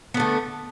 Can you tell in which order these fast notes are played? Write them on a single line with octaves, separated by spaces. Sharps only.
B3 D3 A3